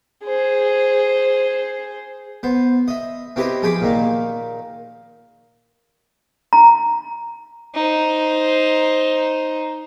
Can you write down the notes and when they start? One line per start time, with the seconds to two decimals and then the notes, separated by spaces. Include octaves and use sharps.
0.24 G#4 C5
2.43 B3 C5
2.88 D#5 E5
3.36 C4 E4 G4 B4 C5 D#5
3.62 F3 G#4 G5 B5 D6
3.81 A#2 D#3 A#3
6.53 A#5
7.74 D#4 C5